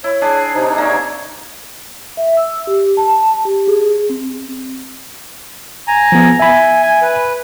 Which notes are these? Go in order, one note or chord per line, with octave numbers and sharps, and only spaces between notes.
E4 C#5
D4 G#4
C3 D#4 C5
A#3 C#5 D5
E5
E6
G4
A5
G4
G#4
C4
G#5 A#5
F3 B3
E5 G#5 B5
G#5
B4